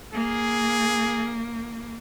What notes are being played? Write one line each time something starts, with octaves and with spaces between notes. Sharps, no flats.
A#3 G#4